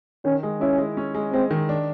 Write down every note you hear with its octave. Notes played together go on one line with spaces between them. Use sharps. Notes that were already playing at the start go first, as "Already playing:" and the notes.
D#3 C#4
G#3
C#4 E4
G#3
C#4
G#3
G#3 C4
D#3
D4